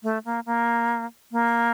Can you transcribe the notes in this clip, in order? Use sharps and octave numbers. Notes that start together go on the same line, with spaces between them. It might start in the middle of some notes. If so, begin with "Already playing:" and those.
A3
A#3
A#3
A#3